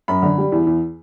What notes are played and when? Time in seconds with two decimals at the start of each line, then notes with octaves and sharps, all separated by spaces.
0.08 F#2 B5
0.23 D3
0.38 G3
0.52 E2
0.67 E2